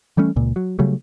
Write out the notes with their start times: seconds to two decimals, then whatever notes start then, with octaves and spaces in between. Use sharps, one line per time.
0.17 E3 G3 A3 C#4
0.36 C#2 A#2
0.56 F#3
0.79 C#3 F#3 G3 A3